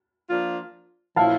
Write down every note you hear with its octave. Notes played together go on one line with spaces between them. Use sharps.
F3 A#3 D4 F4
A#2 F3 C#4 E4 F5 A5